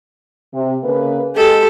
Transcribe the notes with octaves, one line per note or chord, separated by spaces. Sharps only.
C3
C#3 A#3 B4
G#3 G4 A4